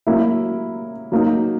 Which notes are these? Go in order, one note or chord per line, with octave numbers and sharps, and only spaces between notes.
F#3 A#3 E4
F#3 A#3 D#4